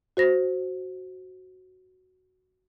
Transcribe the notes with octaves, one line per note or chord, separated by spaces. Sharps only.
F#4 C5 A#6